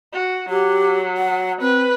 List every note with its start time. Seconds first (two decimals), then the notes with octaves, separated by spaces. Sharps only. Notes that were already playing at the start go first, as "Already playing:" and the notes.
0.13 F#4
0.49 F#3 G4
1.17 F#5
1.61 C4 B4